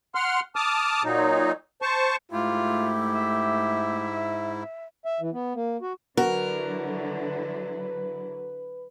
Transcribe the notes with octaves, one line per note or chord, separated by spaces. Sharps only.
F#5 C6 F6
A5 D6 D#6 F6
A#2 F#3 D#4
C5 A5 C#6
G#2 A3 E4 F4 G4
E5
E5
E3
B3
A#3
F#4
D3 F#3 E4 F#4 A#4 B4